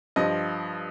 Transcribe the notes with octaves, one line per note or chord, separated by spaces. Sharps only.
G2 F3 D#5